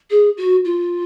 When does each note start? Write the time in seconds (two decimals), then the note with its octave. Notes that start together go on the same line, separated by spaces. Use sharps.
0.11 G#4
0.38 F#4
0.65 F4